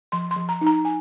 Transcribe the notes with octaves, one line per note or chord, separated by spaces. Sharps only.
F3 C6
C6
F3
A#5
D#4
A#5
G#5